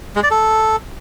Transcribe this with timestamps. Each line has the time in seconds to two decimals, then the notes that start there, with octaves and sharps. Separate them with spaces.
0.16 G#3
0.23 D5
0.31 A4